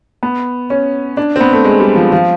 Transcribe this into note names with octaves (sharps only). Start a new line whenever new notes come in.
B3
C#4
D4
C4
B3
A3
G#3
G3
F3
F3